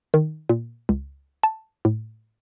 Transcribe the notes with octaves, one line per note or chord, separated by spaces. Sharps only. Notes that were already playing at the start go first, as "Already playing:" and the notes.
D#3
A#2
C#2
A5
A2